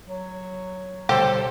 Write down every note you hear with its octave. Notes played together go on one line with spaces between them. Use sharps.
F#3
B2 D3 G3 G4 A4 C5